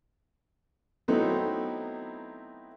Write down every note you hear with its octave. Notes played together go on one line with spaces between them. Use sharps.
F#3 A3 B3 C4 D#4 E4